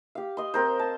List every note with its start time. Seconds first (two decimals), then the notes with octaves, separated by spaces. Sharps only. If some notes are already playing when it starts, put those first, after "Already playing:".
0.15 G4 F5
0.37 D#5 C6
0.54 C4 A#4 C5
0.79 A5